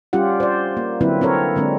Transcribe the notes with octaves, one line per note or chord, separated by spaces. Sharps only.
G3 C#4 F4 G4 F#5
C5 D5
A#3
D3 F#3 A#3 C4 E4 B4
C4 A4 A#4 C#5
D3 G#3 C4 D4